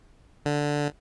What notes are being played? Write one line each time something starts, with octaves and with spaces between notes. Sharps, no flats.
D3